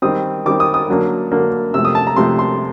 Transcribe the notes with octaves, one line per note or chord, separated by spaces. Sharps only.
D#3 G3 C4 D#6
D#3 G3 C4 D6
D#6
D#6
D3 F#3 A#3 D4
D3 F#3 A#3 D4
C3 F3 A3 E6
D#6
A5
A#5
C3 F3 A3 C6
C6